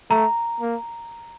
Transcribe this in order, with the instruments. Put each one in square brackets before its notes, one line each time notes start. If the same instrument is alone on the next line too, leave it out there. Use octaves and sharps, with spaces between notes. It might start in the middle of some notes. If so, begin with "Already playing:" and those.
[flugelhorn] A3 [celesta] A#5
[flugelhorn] A#3